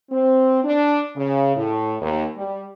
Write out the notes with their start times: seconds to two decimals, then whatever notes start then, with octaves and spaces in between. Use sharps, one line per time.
0.11 C4
0.64 D4
1.17 C#3
1.56 A2
2.01 D#2
2.36 G3